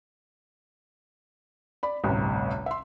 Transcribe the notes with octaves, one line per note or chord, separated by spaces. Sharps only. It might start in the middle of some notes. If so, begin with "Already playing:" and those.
D5 B5
A1 D2 G2 C3
E5 C6